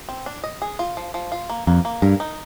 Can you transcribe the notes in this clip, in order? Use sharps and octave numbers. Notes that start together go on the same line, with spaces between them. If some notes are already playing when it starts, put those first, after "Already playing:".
C4
D4
D#5
G#4
F4
F3
F3
F4
A#3
F2 A#3
A#3
G2 A#4
D#4